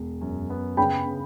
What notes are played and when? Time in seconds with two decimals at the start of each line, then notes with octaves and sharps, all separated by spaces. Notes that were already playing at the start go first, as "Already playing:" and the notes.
Already playing: E1
0.21 F#2
0.50 B3
0.77 C#3 G5 B5
1.06 C#3